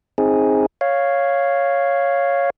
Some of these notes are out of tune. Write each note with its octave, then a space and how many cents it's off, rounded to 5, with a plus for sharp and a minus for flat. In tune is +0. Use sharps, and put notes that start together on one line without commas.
C4 +20 D#4 +25 G#4 +0
C#5 +0 F5 +0